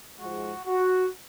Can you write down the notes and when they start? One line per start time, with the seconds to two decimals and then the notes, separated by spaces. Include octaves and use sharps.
0.19 G#2 F3 G#3 F#4
0.66 F#4